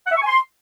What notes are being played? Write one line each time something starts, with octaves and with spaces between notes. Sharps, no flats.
F#5
E5
C#6
G#5
C6